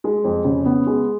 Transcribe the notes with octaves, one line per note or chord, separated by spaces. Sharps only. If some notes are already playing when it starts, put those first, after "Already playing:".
G#3
F2
C#3
B3
G#3